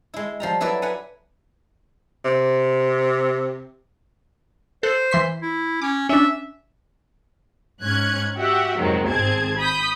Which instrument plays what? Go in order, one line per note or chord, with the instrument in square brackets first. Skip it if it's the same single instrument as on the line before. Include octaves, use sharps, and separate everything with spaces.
[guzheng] G#3 E4
F3 G3 A#5
F#3 E4 A4 B4 D5
B4 F#5 G#5 A#5
[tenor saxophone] C3
[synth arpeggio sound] A4 F#6 [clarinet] C5
[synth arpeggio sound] E3 C6 B6
[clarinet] E4
[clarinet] C#4 [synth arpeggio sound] D6
[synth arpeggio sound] C#4 D4 [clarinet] E5
[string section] G#2 C#4 F#6 G#6
F#4 G4 E5 F#5
F2 C3 D#3 F#3 G#3
G#1 C4 G#4 A5 G#6
B5 D#6 G6 B6